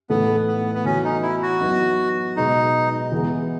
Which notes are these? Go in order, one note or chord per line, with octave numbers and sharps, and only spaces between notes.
A2 E3 A3 B3 D#4 A4
B3
B3
E3 B3 C#4 F#4
D#4
E4
F#4
F#3 B3 D#4
B2 G#3 B3 D#4
E3 G#3 B3